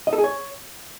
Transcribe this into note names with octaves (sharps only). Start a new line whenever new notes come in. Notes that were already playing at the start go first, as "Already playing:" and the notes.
D#5
A4
G#4
C#5